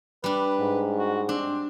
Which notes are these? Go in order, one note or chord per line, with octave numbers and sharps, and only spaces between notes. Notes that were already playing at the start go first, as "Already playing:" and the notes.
G3 D4 B4
G#2
F#4
C4 D4